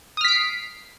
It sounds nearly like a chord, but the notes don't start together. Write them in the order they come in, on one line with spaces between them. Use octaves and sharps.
D#6 F6 B6 D7 C7